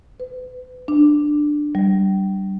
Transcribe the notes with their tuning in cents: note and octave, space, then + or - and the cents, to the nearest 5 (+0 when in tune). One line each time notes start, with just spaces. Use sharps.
B4 +35
D4 +10
G3 -25